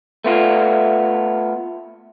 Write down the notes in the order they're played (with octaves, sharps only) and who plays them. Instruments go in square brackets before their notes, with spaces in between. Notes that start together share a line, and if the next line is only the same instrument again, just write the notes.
[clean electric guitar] A3 B3 F4